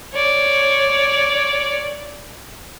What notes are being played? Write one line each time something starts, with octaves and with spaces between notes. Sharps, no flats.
C#5 D5